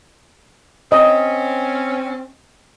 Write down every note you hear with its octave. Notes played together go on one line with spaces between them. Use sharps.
C4 C#4 D#5